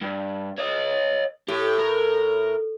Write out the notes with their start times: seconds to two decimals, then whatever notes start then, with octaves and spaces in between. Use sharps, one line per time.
0.02 G2
0.58 C#5 D#5
1.48 A2 G4
1.78 A#4